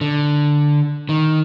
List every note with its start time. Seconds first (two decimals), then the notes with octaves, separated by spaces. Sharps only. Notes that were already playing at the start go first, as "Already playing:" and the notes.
0.01 D3
1.09 D#3